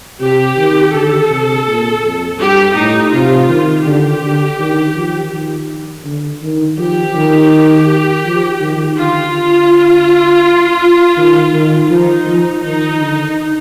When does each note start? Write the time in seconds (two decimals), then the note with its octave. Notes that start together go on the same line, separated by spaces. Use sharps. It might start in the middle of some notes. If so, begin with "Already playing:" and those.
0.21 C3 G4
0.57 D#3
0.94 D3 A4
1.30 C3
1.67 A#2
2.04 F2
2.40 G2 G4
2.76 A2 D#4
3.13 C3 F4
3.49 D#3
3.86 D3 G4
4.23 D3
4.59 D#3
4.95 F3
5.33 D#3
6.05 D3
6.42 D#3
6.78 F3 G4
7.15 D#3
8.25 F3
8.61 D#3
8.98 D3 F4
11.17 D#3
11.53 D#3
11.90 F3 D#4
12.27 F3
12.63 D#3 D#4
12.99 D3